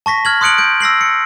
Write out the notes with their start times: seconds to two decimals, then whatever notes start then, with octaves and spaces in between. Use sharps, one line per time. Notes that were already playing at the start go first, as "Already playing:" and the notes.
0.06 A5 C#6 A#6 B6
0.25 F6 G#6 F#7
0.41 C6 D#6 F#6 C#7 D7 F#7
0.58 G6 D7
0.80 E6 A#6 C7 F#7
1.01 C#7